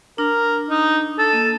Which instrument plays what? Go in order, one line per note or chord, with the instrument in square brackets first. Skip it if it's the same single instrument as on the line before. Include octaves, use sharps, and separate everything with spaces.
[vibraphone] D4 [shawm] A#4
[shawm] D#4
A4
[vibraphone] A#3